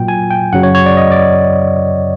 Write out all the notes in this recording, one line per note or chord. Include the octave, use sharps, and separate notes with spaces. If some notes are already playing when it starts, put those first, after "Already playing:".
Already playing: A#2 F#3 G5
G#5
G5
F#2 C#3 F#3 F#5
C#5
C#5
D5
D#5
D5